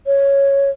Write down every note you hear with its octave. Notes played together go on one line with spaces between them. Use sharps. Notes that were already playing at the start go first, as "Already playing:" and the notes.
C#5